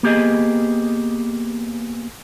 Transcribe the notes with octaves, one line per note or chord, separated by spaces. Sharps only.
A#3 B3 G4 G#4 D#5